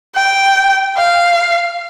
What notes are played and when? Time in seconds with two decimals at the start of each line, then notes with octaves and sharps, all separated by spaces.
0.16 G5
0.97 F5